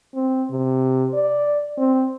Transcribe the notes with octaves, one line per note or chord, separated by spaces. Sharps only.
C4
C3
D5
C4